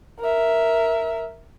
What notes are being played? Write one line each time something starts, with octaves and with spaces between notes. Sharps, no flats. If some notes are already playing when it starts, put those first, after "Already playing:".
A#4 E5